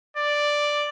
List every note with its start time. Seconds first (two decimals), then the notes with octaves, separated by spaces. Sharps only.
0.17 D5